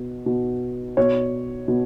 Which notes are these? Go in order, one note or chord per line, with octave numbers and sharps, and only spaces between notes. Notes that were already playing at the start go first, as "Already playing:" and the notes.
Already playing: B2
B2
B2 C#5
B2